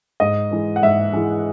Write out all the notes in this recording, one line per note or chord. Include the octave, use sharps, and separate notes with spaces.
G#2 D#5
E3 G#3
F#5
G#2 E5
E3 G#3